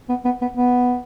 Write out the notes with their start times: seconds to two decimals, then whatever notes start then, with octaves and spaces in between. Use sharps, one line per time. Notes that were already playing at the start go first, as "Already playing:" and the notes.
0.09 B3
0.25 B3
0.41 B3
0.57 B3